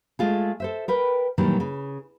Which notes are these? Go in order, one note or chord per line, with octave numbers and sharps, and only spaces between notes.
G#3 A3 F4 G#4
A4 C5 E5
A#4 B4 G5
A#2 D#3 E3 F#3 G3
C#3